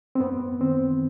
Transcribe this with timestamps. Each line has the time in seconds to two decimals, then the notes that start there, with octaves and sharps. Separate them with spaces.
0.15 C4
0.20 F#2 B3
0.61 D#3 C4